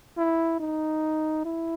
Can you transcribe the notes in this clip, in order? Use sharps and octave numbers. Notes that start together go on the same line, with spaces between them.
E4
D#4
E4